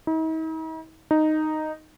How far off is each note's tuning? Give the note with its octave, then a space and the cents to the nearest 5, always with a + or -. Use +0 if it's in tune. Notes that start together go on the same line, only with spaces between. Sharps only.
D#4 +45
D#4 -5